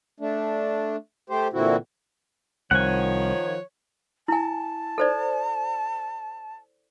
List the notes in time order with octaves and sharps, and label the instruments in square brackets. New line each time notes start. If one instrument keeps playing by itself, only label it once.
[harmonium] A3 D4
A3 G4 C5
A#2 D3 E3 C4 E4 F#4
[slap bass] C2 [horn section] D#3 F3 [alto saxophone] C#5 [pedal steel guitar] F#5 G#5
[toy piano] E4 G#5 [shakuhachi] A5
[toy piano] A4 C5 D5